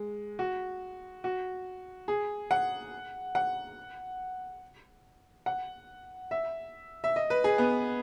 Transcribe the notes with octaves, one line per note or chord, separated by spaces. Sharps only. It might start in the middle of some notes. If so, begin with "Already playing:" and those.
Already playing: G#3
F#4
F#4
G#4
F#5
F#5
F#5
E5
E5
D#5
B4
G#4
B3